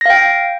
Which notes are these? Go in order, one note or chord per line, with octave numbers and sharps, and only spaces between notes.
F5 G5 A#6